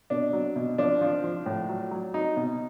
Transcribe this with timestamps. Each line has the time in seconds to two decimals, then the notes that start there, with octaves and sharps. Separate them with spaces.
0.10 B2 D4
0.33 F#3
0.56 B2
0.78 F3 D4
1.01 F3
1.24 F3
1.46 A2
1.69 F#3
1.91 F#3
2.14 F#3 D#4
2.37 B2